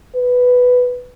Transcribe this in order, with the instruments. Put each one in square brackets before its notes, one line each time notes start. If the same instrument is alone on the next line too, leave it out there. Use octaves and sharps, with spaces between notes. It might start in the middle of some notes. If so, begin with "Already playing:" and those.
[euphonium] B4